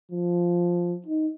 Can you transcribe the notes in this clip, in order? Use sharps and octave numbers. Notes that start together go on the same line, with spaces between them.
F3
D#4